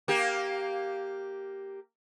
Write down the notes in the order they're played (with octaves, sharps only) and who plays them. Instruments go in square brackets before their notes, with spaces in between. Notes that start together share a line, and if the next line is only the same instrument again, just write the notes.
[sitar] A#3 G4